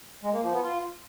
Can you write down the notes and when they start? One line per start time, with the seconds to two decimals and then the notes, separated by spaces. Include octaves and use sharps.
0.23 G#3
0.33 A#3
0.43 F3
0.53 B3
0.63 F4